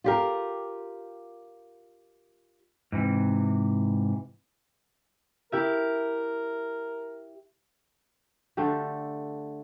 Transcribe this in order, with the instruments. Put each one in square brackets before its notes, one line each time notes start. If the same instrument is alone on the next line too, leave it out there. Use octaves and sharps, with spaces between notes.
[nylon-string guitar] F4 G4 A#4
[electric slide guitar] G#2 C3 E3
[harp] E4 G4 E5 [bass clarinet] A#4
[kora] D3 A3 D4 G4